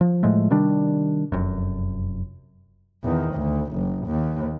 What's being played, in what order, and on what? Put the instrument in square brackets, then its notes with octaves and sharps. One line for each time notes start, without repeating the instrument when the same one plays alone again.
[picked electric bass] F3
A2 F3 G#3 A3
C3 D#3 G3 D4
F1 F#2
[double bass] E2 D#3
D2
F#1
D#2